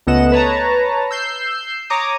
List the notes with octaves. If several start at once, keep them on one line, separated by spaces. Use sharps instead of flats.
C#2 A3 B3 D#5 F#5 E7
B4 C#5 A5 A#5
E6 G6 C7
C#5 A#5 D6 D#6